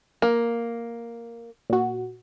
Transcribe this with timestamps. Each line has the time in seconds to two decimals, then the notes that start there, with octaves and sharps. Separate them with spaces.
0.22 A#3
1.70 A#2 F#4